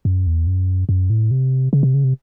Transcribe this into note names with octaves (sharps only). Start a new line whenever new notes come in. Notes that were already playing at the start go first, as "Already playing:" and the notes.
F#2
E2
F#2
F#2
A2
C3
C#3
C3
C#3
C3